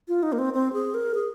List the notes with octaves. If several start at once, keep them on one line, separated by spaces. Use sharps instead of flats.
F4
D#4
A#3
C4
C4
G#4
A#4
G#4